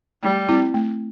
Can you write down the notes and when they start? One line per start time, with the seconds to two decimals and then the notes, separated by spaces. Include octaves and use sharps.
0.23 G3 A3
0.49 C4 E4
0.74 A3